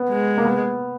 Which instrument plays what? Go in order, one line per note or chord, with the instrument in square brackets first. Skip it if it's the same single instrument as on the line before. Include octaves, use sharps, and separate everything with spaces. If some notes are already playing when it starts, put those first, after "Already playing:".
Already playing: [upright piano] B3
[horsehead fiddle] G#3
[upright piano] A#3
B3